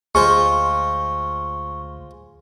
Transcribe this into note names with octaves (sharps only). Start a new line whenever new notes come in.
D2 G#3 F4 C5 C#6